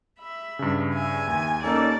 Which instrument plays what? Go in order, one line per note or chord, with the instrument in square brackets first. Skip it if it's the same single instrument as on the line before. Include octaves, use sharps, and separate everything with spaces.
[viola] E5 B5
[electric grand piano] G2 C#3
[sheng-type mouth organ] E5 [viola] G#5
[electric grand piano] D#2
[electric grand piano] A#3 G4 [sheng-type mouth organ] C#4 D#4 A4 [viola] D5 A5